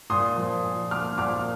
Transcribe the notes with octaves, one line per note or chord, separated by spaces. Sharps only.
A#2 C6 D#6
F3
A#2
A#3 D6 F6
A#2 D6 F6